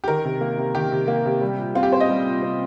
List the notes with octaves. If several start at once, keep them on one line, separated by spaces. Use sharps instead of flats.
G4
D#3 A#4
C3
A#3
C3
D#3 G4
C3
A#3
C3
G3
A#2
C4 F4
G4
A#2 C5
D#5
G3
A#2
C4